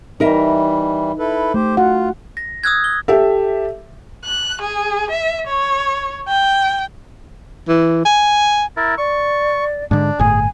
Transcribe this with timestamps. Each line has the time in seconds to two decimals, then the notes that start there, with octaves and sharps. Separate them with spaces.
0.20 E3 G3 D#4 A#4 E5
1.19 E4 A4 B4
1.54 A3 G4 C5
1.77 F4 F#4 F#5
2.37 A#6
2.64 D#6 E6 F#6 G#6
2.84 G7
3.08 G4 A4 E5
4.24 F#6
4.62 G#4
5.11 E5
5.47 C#5
6.28 G5
7.68 E3
8.05 G#5
8.77 E4 A#4 A6
8.98 D5 C#6
9.91 G#2 D3 D4
10.19 G1 A2 G#4 G#5